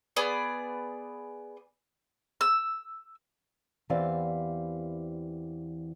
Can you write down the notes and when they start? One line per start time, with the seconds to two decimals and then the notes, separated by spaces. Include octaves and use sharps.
0.16 B3 G#4 D5
2.41 E6
3.90 E2 E3 C4 G4 D5 F5